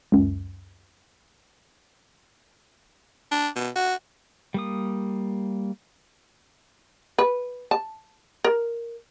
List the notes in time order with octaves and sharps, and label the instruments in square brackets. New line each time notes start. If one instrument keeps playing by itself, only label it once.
[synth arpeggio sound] C#2 F#2
[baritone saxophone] D4
B2
F#4
[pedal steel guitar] G3 A#3 D#6
[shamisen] B4
A5
A#4